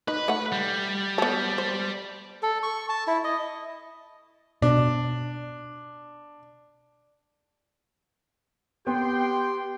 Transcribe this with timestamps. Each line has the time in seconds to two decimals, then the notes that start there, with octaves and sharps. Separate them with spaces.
0.08 D#4 B4
0.28 A3 F#5
0.52 G3
1.18 B3 A4
1.58 C5
2.43 A4
2.63 C#6
2.89 A5
3.07 E4
3.24 D#5
4.62 B2 D4
8.87 B3 G4 G5 C6